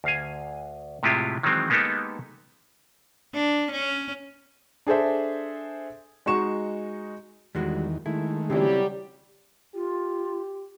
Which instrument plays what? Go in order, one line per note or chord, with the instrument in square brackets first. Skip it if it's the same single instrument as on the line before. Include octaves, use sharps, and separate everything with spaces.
[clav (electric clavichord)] D2 F5 G#5
A2 C3 G#3 E4 F4 G4
D#3 E3 F#3 G#3 C4
G#3 A#3 B3 D#4 G4 A4
[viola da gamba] D4
C#4
[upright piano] D4 G#4 A4 C5 E5
G#3 D#4 F#4 C#6 E7
[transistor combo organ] E2 D#3 [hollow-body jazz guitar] G3 G#3 F#4
[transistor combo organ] D#3 G#3 A3 [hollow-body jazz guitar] E4
[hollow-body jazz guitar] C#3 C4 E4 [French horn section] F#3 G3 G4
[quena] F4 [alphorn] G4